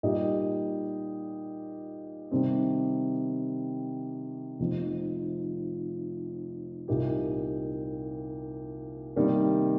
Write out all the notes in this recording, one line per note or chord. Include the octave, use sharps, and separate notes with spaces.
A#2 G3 D#4 G4 D#5
C3 D#3 G3 C4
F1 F2 F3 D#4
C2 A#2 A#3 D#4 G4
C3 D#3 G3 A#3